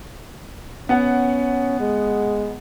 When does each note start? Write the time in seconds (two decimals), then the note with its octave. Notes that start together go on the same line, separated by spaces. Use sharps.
0.89 B3 C#4 F#5
1.80 G#3